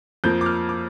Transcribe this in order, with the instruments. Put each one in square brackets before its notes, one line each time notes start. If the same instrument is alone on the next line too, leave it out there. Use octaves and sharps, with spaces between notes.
[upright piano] F2 F3 A#3 G6
D6
F6
D6